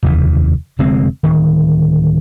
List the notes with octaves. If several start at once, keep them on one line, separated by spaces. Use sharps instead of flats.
F1 D#2 C#3 E3
F1 D3 G#3 C4
D1 D#3